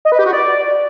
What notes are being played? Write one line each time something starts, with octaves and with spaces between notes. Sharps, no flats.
D#5
B4
G4
F#4
D5